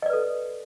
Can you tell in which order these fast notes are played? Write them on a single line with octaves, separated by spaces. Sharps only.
D#5 D5 B4 A4